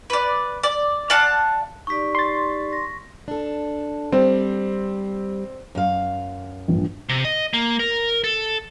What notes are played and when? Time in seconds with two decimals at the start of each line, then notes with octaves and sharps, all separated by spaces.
0.10 B4 D5
0.63 D5
1.10 D5 F5 F#5 A5
1.87 D#4 G4 D5 C#6 B6
2.15 C6 A6
2.73 A#6
3.28 D4 A4
4.12 G3 C4
5.75 F#2 F5
6.68 A#1 G2
7.09 C3
7.25 D#5
7.54 A#3
7.79 A#4
8.24 A4